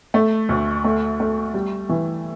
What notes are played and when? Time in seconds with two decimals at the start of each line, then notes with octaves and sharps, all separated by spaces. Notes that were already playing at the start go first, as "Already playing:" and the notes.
0.14 A3
0.49 D2
0.84 A3
1.20 A3
1.54 G3
1.89 E3